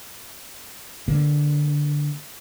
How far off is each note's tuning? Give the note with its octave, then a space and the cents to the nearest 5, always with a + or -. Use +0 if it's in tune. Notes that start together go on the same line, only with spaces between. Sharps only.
D3 +0 A#3 +10